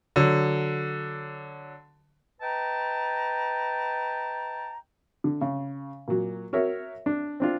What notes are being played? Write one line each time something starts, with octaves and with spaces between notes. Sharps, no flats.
D3 F#3
B4 D#5 G5 A5 A#5
D3
C#3
A#2 F#3
F#4 A#4 C#5 E5
D4
C4 D4 F4